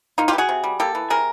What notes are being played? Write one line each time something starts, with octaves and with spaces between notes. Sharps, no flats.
A#3 D#4 F4
F4 G4
E3
F#4 G#4
C3
G3
A#3 G4 A4
E3
C3 G#4 A#4